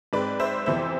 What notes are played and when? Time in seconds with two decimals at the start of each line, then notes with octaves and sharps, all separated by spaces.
0.13 G#2 G#3 C4 B4 D5
0.40 C5 E5
0.66 F2 C3 E3 B3 C5 E5